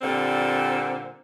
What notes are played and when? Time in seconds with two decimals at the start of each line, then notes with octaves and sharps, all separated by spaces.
0.01 A#2 D3 G3 C4